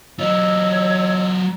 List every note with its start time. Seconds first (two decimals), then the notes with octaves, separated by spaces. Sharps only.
0.19 F#3 F4 C#5 D#5 E6